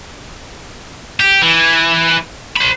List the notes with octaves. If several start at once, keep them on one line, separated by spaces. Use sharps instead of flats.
G4
E3
C5 B5